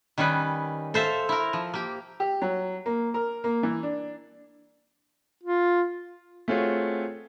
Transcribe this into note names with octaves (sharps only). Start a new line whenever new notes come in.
D#3 G3 C#4 D#4 B4
A4 C5 E5 F5
E4 A#4
F3
A#3 G4
G4
F#3
A#3
A#4
A#3
E3
D4
F4
A3 C4 F4 F#4 G#4 C#5